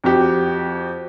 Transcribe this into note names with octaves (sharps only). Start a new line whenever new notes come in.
F2 F#4 G4